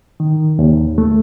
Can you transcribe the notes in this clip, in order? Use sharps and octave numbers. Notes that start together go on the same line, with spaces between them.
D#3
D#2
A3